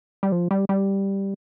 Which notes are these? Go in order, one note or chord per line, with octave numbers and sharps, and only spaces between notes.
G3
F3
G3
G3